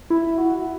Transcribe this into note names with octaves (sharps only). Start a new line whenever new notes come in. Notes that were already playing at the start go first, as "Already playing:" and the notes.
E4
F#4